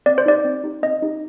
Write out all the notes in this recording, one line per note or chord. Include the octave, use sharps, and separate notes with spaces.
C4 D5
C5
D#4 G4 D5
C4
D#4 G4
C4 D#5
D#4 G4